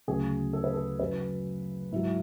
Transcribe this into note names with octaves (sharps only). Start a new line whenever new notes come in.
D2 C#3 F#3 G#4
A4
B4
A4
F#2 C#3 F#3 B4
G#2 F#3 E4